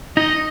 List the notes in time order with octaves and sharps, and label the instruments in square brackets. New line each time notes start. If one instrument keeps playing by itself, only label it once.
[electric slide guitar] D#4 [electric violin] D#5